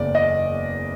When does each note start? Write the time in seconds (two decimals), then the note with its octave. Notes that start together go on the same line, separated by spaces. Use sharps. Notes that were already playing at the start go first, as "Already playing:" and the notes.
Already playing: F#1 E2 C#3 D5
0.15 D#5